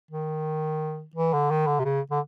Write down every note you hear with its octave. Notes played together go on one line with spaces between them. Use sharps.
D#3
E3
D3
D#3
D3
C3
C#3
D3